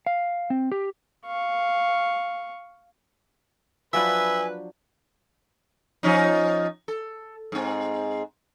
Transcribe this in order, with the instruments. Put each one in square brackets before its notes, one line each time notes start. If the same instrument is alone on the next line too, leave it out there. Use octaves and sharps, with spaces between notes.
[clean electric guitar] F5
C4
G4
[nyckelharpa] F5 C#6
[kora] F3 F#3 D4 [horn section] B4 [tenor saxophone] E5 [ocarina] G#5
[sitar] F3 C#4 D#4
A4
G#2 C4